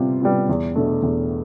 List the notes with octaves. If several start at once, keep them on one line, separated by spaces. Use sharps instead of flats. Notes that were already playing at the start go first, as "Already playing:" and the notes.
Already playing: C3 G3 B3 F4
G3 B3 F4
E2
B2 A3 D4
E2